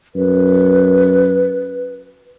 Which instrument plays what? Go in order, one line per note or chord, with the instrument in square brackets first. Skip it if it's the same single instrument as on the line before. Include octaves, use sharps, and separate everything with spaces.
[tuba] F#2 [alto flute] B4